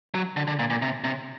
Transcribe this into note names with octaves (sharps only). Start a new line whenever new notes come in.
F#3
D3
D3
A#2
A#2
C3
C3